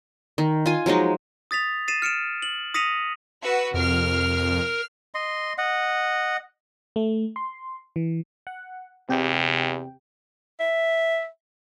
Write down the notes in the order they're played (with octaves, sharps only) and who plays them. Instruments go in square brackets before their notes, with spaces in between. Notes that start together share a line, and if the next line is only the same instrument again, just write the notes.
[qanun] D#3
F4 G#5
F3 F#3 G#3 D#4
[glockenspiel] D#6 A6 B6 F7
A6 C7 D#7 E7
F6 C#7 D7 E7
F#7
D#6 A#6 B6 C#7 D#7 F7
[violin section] F#4 B4 E6
[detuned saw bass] F2 [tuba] C3 [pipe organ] A#4 [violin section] F6 C7
[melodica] D#5 C6
D#5 F#5
[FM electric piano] A3
C6
E3
F#5
[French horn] E2 [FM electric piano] C3 G4 G5
[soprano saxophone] E5